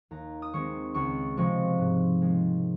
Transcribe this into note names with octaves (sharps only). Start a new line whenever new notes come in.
D#2 A#5
D#6
D#3 G#3 C4 C#6
C#2 C#6
C3 F3 G#3 C4 C#6
G#2
D#3 G#3 C4